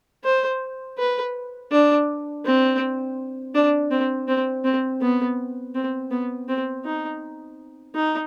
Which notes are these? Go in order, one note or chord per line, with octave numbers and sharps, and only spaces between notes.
C5
B4
D4
C4
D4
C4
C4
C4
B3
C4
B3
C4
D#4
D#4